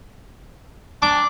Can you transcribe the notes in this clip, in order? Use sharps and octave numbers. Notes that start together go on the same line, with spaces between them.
D4 D6